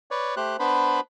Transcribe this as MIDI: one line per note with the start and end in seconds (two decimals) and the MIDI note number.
0.11 0.35 71
0.11 0.35 73
0.11 0.35 74
0.37 0.57 57
0.37 0.57 67
0.37 0.57 72
0.37 0.57 90
0.59 1.00 59
0.59 1.00 62
0.59 1.00 71
0.59 1.00 72
0.59 1.00 83